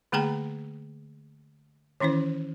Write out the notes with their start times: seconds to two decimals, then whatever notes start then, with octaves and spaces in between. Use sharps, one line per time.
0.12 D3 A3 A#3 G#4 G5 A#5
2.00 D#3 E3 C#4 E4 C5